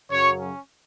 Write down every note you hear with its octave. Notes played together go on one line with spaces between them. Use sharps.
F#2 C#3 F#3 C#5
C#4